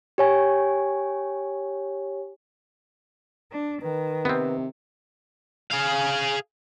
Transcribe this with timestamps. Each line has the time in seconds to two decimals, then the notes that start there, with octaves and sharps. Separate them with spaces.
0.18 G4 C#5 G#5
3.51 D4
3.82 D#3 B4
4.25 C3 B3 C4
5.71 G#4 F5